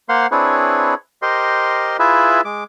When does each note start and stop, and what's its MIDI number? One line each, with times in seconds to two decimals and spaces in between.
0.09 0.27 58
0.09 0.27 72
0.09 0.27 77
0.09 0.27 78
0.09 0.27 84
0.31 0.94 60
0.31 0.94 62
0.31 0.94 64
0.31 0.94 68
0.31 0.94 71
0.31 0.94 73
1.22 1.97 67
1.22 1.97 70
1.22 1.97 72
1.22 1.97 75
1.22 1.97 84
1.99 2.41 64
1.99 2.41 65
1.99 2.41 68
1.99 2.41 71
1.99 2.41 76
2.45 2.64 56
2.45 2.64 86